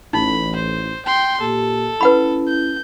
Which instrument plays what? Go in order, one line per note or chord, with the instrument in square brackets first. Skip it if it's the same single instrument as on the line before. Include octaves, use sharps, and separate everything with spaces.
[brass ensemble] A1 [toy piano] D#4 [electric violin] B5
[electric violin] C5
G5 C6
[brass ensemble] A#2 A#3 G4 [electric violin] A4
[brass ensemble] C#4 E4 [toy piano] B4 F#5 B5
[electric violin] G6